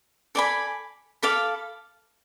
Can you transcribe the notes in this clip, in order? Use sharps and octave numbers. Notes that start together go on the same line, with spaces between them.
A4 D5 G#5 B5
A4 F5 B5 D6